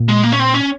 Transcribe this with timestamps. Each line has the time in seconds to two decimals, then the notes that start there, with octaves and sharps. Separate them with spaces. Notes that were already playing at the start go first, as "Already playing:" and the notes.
Already playing: A#2
0.09 G#3
0.23 A#3
0.32 C#4
0.40 C4
0.54 C#4